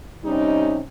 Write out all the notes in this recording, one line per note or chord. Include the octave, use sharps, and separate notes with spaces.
C3 G3 C#4 D#4